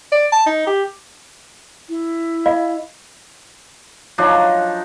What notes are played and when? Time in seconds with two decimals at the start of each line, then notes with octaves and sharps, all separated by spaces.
0.12 D5
0.32 A5
0.46 D#4
0.67 G4
1.90 E4
2.46 D#5 F5 B5
4.18 F3 F#3 D4 D#4